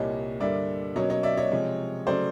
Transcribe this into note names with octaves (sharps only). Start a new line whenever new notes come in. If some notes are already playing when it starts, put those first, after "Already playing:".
Already playing: C2 A#2 G3 C#5 D#5
G2 D3 G3 A#3 D5 E5
B2 F#3 A#3 C#4 C#5 D#5
C#5 D#5
D5 E5
C#5 D#5
C3 F3 G#3
C#3 F#3 A3 C5 D5